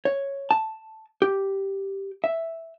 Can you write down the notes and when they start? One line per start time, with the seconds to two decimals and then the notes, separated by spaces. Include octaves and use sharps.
0.05 C#5
0.51 A5
1.22 G4
2.24 E5